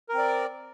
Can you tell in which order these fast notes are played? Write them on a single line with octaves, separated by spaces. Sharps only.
A#4 C4 D5